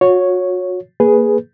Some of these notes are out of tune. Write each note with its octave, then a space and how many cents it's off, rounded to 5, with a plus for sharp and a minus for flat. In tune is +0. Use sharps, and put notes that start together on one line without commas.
F#4 -35 C#5 +0
A#3 +0 G#4 +0 B4 +0